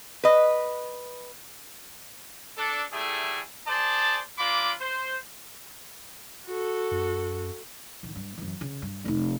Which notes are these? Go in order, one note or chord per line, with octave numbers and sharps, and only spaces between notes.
B4 D#5
D4 A4
G3 A3 E4 G#4 A4
G#4 C5 D5 A5
A#3 D4 F4 B5 D6
C5
F#4 A4
F#2
A1 D#3
G2
F#2 E3
C#3
G2
F1 D#4